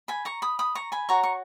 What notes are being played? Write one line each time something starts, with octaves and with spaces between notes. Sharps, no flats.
G#5 B5
A#5 C#6
B5 D#6
B5 D#6
A#5 C#6
G#5 B5
F#4 C#5 A#5 C#6
C#6